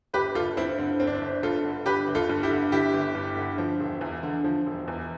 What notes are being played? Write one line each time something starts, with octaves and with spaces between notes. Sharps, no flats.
G1 G4 B4
G1 F4 A4
G2 C4 E4
D3 C4
G1 C4
D4
C4
G1
G2 F4 A4
D3
G1 G4 B4
G1
F4 A4
G2
E4 G4
D3
G1 E4 G4
G1
G2
D3
F3
E1
E2
D3
F3
E1
E2